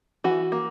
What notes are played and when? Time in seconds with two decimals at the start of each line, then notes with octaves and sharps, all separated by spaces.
0.24 E3 F#4
0.52 A#3